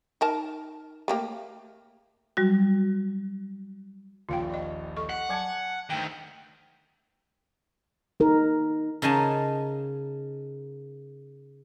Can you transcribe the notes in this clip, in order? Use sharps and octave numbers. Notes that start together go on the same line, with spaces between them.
D#4 A#4 A5
A3 A#3 G4
F#3 G3 F#4
D#1 A#1 F4 F5 G5
D5 D#5
A4 D#5 C#6
F#5
F#3 G#5 A5 G#6 C#7
D2 D#3 G5
D#4 A#4
C#3 D#4 A#4 G#5 A5